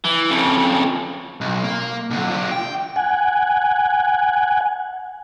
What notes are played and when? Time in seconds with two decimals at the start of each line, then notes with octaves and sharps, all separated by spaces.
0.04 E3
0.30 F2 C#3
1.41 B1
1.64 A#3
2.10 B1 D3
2.29 D4 F4
2.51 G5
2.96 F#5 G#5